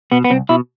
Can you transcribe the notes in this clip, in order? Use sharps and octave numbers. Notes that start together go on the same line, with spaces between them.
B2 B3
B3
C2 C4
B2 E4